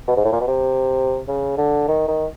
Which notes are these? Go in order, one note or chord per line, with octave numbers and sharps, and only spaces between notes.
B2
G#2
A2
A#2
B2
C3
C#3
D3
D#3
D#3